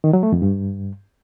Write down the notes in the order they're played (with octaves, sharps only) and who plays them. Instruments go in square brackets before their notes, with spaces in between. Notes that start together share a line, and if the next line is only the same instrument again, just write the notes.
[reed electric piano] D#3
F#3
A3
F2
G2